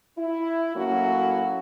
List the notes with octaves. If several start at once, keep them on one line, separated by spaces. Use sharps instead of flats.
E4
A2 F#3 A#3 C#4 E4 F#4